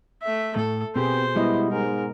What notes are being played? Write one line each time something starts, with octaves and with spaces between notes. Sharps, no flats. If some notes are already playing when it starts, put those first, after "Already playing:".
A3 E5
A2 A4
B2 C4 G4 G#4 B4 C5
G3 G#3 B3 E4 D#5
G#2 A#4